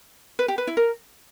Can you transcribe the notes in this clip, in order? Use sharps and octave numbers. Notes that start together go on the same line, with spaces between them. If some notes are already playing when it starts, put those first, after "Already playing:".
B4
G4
B4
E4
A#4